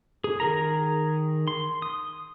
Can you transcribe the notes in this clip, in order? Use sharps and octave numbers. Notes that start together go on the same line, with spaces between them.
G#4
D#3 G#4 A#4 A#5
C6
D#6